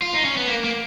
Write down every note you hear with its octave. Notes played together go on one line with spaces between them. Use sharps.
F4
D#4
C#4
B3
A#3
A#3